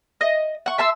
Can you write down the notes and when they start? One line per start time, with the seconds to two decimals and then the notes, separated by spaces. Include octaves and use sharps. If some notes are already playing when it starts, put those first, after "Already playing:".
0.21 D#5
0.66 F#5 C#6
0.78 E5 A5 C6 E6